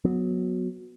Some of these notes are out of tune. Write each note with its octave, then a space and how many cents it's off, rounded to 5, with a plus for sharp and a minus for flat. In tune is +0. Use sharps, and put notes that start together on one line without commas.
F#3 -15 B3 -10